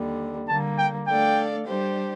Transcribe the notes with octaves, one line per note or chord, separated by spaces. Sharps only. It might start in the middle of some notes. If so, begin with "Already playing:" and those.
Already playing: D#2 D3 G3
D3 G3 A#3 A5
G5
A3 D4 A4 D5 F5 G5
G3 D4 G4 C5